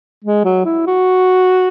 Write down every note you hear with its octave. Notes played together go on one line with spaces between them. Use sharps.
G#3
F#3
E4
F#4